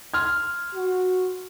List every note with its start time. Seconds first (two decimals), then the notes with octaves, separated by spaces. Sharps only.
0.14 C6 F6 G#6
0.74 F#4